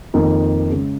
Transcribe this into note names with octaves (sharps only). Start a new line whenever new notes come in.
F2 D#3 A#3 D#4
C#3 G#3